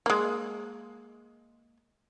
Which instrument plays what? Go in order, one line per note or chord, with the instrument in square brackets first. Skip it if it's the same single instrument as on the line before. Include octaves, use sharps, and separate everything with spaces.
[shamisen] G#3 A#3